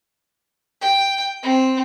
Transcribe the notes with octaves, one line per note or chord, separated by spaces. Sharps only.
G5
C4